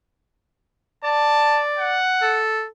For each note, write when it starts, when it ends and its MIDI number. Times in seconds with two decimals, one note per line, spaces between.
1.04 2.00 74
1.04 1.61 81
1.79 2.41 78
2.22 2.66 69